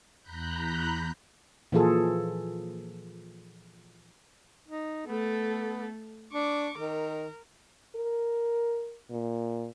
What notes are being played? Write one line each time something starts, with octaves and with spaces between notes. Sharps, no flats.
E2 A#5 B5 F#6 G6
A#2 E3 F3 F4 G#4 A4
D#4
A3 B3 A4
D4 C#6 D6
D#3 A#4
A#4
A#2